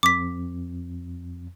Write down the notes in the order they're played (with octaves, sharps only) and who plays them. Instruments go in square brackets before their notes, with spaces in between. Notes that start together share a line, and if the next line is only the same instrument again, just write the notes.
[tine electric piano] F2 [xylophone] D6 B6